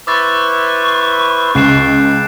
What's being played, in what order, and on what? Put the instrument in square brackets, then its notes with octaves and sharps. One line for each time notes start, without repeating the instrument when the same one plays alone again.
[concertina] E4 B4 C5 [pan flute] C#6 [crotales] D6 E6 A6
[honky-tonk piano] C#2 [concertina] G5 A5 [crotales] F#6 C7 E7